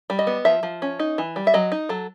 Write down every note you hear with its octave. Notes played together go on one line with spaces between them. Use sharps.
G3
D#5
B3
F3 E5
F3
C#4
D#4
E3
G3
E5
F#3 D#5
D#4
F#3 A4